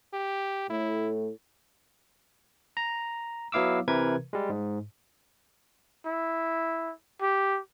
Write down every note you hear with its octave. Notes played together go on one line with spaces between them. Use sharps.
G4
A2 E4
A#5
F#3 B3 E4 F5 D6 E6
C3 E3 A#4 B4 G#6
G3 G#3
G#2
E4
G4